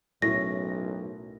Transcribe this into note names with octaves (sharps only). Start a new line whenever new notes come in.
B1 F#2 A2 A#6